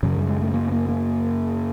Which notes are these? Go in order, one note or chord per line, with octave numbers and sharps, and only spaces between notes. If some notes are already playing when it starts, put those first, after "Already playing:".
F#2 C#3 F#3
G3
G#3
A3
A#3
A#3
A#3